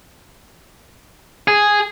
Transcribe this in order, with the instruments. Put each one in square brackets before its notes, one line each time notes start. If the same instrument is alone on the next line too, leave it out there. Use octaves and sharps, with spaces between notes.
[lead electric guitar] G#4